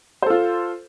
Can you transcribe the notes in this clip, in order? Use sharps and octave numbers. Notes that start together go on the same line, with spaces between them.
F4 A4 C5